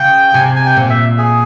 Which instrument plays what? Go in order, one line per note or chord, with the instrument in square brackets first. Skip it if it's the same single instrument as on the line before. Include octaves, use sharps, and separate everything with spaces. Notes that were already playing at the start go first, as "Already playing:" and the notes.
Already playing: [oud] C#3 [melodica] G5
[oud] C3 [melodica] G#5
[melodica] G#5
G5
[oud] A#2
[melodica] E5
G#4